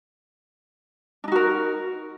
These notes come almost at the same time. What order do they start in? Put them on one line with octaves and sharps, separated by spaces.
D4 D#4 F#4 A#4